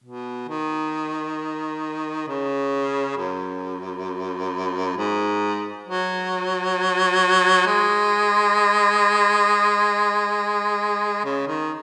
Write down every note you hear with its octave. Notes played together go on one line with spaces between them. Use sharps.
B2
D#3
C#3
F#2
G#2
F#3
G#3
C#3
D#3